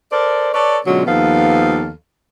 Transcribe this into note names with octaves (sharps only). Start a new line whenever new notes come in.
A4 A#4 C5 D5
A4 B4 C#5 D5
B2 D3 F#3 G#3 C#4 F4
D#2 F3 B3 A4 F5